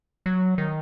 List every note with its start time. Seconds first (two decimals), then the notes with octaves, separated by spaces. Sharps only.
0.26 F#3
0.58 D#3